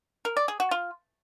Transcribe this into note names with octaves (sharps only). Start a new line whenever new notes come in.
A#4
D5
G#4
F#4
F4